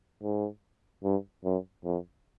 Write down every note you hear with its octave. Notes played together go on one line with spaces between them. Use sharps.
G#2
G2
F#2
F2